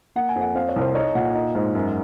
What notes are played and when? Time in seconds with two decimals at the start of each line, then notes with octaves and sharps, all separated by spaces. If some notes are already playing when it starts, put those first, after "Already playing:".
0.16 A#3 F#5
0.29 G#5
0.35 F2
0.41 F#5
0.55 C4 F5
0.69 C#5
0.76 C2
0.81 C5
0.95 D#4 C#5
1.15 A#2 F#5
1.35 D#4
1.55 G#2
1.75 F#2